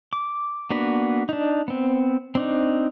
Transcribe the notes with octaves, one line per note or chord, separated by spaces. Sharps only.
D6
A#3 B3 D4 F#4 B4
D4 D#4
B3 C4
C4 D4 D#4